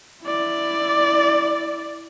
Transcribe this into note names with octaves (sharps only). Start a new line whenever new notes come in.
E4 D5